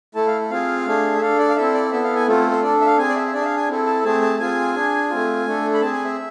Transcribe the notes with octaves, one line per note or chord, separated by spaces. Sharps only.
A3 E4 A4 A5
F5
C4 F4 G#4 F5
A3 D4 G#4
E5
D4 A4 F5
D5
F5
C4 E4 A4 E5
D5
B3 E4 A4 E5
F5
G#5
A3 C4 F4 A4
C5
D4 A4 D5
E5
F5
C4 G#4 G#5
D5
E5
E5
D4 G#4 D5
E5
F5
G#5
C4 E4 A4
A5
A3 C4 G#4 A5
A5
C4 F4 G#4 G#5
D4 G#4
A3 C4 F4
A3 D4 A4
B5
C4 G#4 A5
G#5
E5